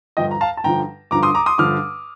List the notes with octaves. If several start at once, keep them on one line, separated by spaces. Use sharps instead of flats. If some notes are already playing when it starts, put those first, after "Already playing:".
G2 D3 F3 D#5 G5
A#5
F5 A5
A5
G2 D3 F3 G5 A#5
G2 D3 F3 A#5 D6
C6 D#6
A#5 D6
C6 D#6
G2 D3 F3 D6 F6